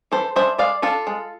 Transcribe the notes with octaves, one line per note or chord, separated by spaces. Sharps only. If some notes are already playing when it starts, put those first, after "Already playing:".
E3 A4 C5
G#3 D4 C5 E5
G#3 D5 F5
D4 F4 A4
G#3